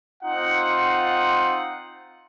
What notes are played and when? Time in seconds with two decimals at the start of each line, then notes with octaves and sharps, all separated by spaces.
0.23 C4 D#4 F4 F#5